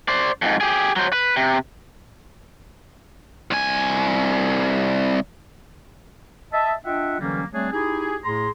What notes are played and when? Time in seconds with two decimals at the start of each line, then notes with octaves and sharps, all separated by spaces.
0.08 C5 D5
0.42 F2 G#2
0.61 G4 G#4
0.96 F#3 C5
1.13 B4
1.37 C3
3.51 C2 G#5
6.52 D#5 E5 A5
6.85 D4 F4 D#5 E5 F#5 G5
7.20 D3 E3 F#3 G3 A#3 C#4
7.53 G3 A3 C4 D4 G#4 C#5
7.72 D#4 E4 G4 G#4
8.24 A2 A3 G#4 A#5 C6